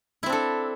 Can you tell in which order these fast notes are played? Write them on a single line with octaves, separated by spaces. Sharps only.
E4 C4 D4 A4